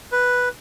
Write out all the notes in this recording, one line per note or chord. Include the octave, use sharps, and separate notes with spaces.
B4